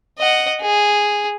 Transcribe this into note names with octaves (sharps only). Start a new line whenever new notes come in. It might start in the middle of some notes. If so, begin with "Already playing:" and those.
D#5 F#5
G#4